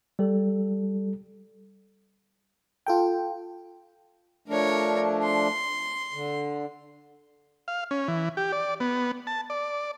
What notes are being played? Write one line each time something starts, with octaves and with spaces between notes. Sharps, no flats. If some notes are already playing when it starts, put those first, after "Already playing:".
G3 A4
F4 A4 G5
F3 A3 D4 A#4 C#5
C6
D3
F5
C#4
E3
G4
D5
B3
A5
D5